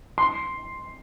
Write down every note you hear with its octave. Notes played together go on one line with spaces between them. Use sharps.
C6